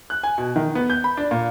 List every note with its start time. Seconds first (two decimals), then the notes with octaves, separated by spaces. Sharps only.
0.10 F#6
0.23 G#5
0.38 B2
0.56 D#3
0.75 B3
0.90 G6
1.04 B5
1.17 D4
1.31 A#2